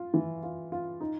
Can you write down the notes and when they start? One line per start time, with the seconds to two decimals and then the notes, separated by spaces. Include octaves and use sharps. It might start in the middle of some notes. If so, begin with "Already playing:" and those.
Already playing: F4
0.14 E3
0.43 F4
0.72 F4
1.01 D#4